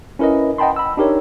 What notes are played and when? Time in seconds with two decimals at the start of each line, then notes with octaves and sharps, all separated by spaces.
0.19 C#4 E4 A#4 B4 D#5
0.58 D#5 F#5 G5 A5 B5 C6
0.76 B5 E6
0.97 D4 D#4 G4 A#4 C#5